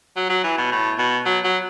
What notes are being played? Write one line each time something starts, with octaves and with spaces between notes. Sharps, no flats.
F#3
F#3
E3
B2
A2
B2
F#3
F#3